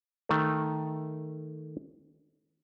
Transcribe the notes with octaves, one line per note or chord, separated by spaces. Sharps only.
D#3 A3